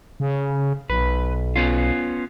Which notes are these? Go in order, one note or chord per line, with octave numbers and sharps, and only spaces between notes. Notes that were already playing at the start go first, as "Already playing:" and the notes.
C#3
B1 B4
B3 C#4 F4